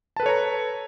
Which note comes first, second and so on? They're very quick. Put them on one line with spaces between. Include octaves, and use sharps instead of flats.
A5 B4 A4 C#5 A#5